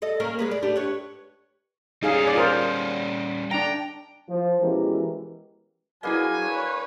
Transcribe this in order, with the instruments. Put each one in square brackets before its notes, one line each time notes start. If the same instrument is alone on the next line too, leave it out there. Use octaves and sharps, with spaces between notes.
[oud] A4 D#5
A#3 C#4 A#4
G#3 G#4 B4
D5
A3 D4 G4
B4 C#5
[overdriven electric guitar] G3 C#4 [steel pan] D#4 G#4 F5
[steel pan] G#4 D5
F4 A#4 C5
[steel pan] D4 A#5 [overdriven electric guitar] G5
[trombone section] F3
B2 E3 G#3 C#4 G4 A#4
[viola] F#3 [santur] A#3 B3 D4 [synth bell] E4 G#4 D#5 [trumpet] G#5
[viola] B4 C#5 [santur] E6